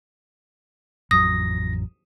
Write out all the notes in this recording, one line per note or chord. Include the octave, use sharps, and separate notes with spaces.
A1 F2 F#3 D#6 A#6